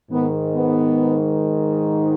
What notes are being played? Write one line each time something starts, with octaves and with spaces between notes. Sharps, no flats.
G#2 D#3 B3
B3